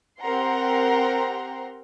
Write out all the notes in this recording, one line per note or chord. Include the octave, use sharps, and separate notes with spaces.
C4 G4 A#4 F#5 A#5 C6